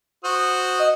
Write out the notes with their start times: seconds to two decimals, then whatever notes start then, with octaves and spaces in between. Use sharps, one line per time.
0.24 F#4 C5 D#6
0.79 D#5